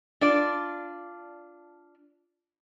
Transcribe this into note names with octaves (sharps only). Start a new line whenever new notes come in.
D4 F4 D5